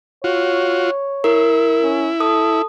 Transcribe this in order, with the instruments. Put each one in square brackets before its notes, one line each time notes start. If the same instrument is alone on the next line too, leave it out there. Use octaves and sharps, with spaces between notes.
[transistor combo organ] F4 F#4 [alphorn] C#5
[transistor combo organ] E4 [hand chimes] A#4
[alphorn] C#4
[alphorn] A4 [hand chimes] D#6